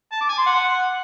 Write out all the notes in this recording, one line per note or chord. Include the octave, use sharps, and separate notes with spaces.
A5
D6
G#5
C6
F#5